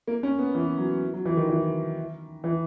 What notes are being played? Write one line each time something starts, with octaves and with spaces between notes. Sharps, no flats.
A#3
C#4
B3
E3
F#3
F#3
E3
D#3
E3
E3